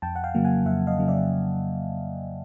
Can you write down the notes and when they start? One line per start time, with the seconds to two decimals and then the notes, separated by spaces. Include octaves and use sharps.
0.02 F2 G5 A5
0.16 F#5
0.24 F5 G5
0.35 C#3 F#3 A#3
0.45 F#5 G#5
0.66 F2 E5 F#5
0.87 D#5 F5
0.98 C#3 F#3 A#3
1.08 D5 E5